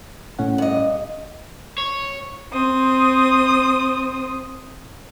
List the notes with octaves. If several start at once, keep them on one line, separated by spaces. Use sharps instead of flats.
A2 C#4 F#5
G2 D#5
C#5
C4 D#6